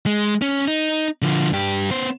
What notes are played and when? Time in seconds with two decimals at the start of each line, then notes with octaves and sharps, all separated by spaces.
0.06 G#3
0.42 C#4
0.68 D#4
1.22 D3 F3
1.53 G2 G4
1.90 B3 C5